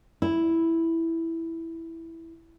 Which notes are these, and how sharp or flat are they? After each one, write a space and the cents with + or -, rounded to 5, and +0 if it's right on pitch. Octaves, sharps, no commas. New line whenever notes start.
E4 +0